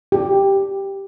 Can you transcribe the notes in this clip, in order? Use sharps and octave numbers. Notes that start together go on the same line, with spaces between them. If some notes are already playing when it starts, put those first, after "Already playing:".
G4